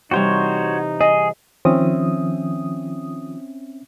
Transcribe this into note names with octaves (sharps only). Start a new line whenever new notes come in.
C3 E3 G3 D#4 F#4 C5 C#5
G#4 D#5
D#3 F3 C4 C#4 E5 D#6